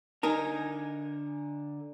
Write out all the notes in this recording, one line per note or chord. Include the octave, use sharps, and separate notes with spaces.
D3 D#4 A#4 G#5 A#5